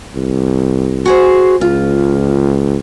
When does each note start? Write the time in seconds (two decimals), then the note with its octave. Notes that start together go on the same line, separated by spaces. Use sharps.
0.15 C2
1.06 F#4 G#4 C5
1.61 C#2 F4